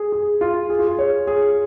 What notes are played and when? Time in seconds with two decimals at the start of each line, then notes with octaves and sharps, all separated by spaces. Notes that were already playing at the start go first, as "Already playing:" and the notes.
Already playing: G#4
0.12 G#4
0.41 F4
0.70 G#4
0.79 F4
0.88 G#4
0.99 C#5
1.27 G#4